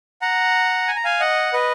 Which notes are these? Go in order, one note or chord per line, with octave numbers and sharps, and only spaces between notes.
F#5 A#5
G#5
A#5
F5 G#5
D#5 F#5
B4 D#5